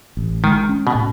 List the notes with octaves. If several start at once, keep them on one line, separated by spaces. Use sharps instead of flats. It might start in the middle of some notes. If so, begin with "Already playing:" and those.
A1
D#3 G#3
C#4
B2
A2